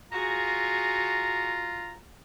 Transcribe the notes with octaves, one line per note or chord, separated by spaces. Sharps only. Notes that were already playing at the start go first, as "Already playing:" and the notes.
F4 F#4 G#4 A#5